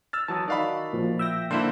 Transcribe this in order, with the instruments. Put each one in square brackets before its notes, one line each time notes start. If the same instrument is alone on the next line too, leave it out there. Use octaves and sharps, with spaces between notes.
[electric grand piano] E6 F6 A6
[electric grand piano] E3 F#3 [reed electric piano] A5 D#6
[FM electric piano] D#3 D#4 F#4 [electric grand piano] D5 F5 B5
[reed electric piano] A#2 F3
[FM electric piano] E5 G5 A#6
[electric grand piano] D3 A#3 E4 [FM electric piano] C5 E6